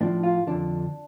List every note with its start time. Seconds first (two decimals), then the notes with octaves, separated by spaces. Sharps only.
0.01 A2 F3 D4
0.23 F4
0.47 F2 D3 F3 D4